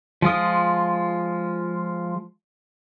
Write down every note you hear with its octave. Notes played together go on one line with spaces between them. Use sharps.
F3 G#3 F4 D#6